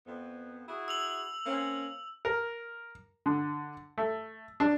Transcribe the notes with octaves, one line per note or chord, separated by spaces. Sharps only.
F2 B3
E4 F#4 G#4
E6 F7 F#7
A#3 C4 C#4
A#4
D3
A3
D4